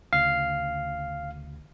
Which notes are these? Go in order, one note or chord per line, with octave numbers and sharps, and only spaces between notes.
D2 C#3 F5